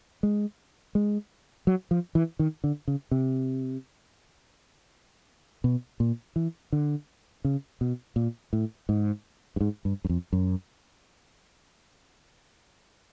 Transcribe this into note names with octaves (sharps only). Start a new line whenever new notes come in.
G#3
G#3
F#3
F3
E3
D#3
D3
C#3
C3
B2
A#2
E3
D3
C#3
B2
A#2
A2
G#2
G2
G#2
G2
F#2
F2
F#2